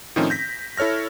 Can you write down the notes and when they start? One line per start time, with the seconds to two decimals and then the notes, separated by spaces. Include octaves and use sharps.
0.16 A2 D#3 F3 C4 C#4 D#4
0.30 G6 A#6 B6
0.77 E4 A4 C#5 F6 A#6